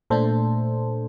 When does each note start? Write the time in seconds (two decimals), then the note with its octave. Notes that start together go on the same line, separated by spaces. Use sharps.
0.10 A#2 A3 D4 A4 C5